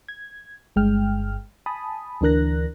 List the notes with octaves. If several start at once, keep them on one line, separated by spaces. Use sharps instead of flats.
G#6
G1 G2 G#3 G5 F6
G#5 A5 B5 D#6
D2 E3 D4 A#4 F#6 A#6